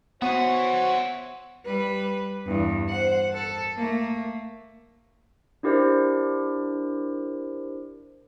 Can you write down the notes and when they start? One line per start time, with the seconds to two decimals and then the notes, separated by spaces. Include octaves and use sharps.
0.22 B3 F#4 C5 C#5 E5 F#5 G#5
1.66 G3 B4
2.46 E2 G2
2.89 C5 F#5
3.32 A4
3.76 A3 A#3
5.63 D4 E4 G4 A#4 C5 D5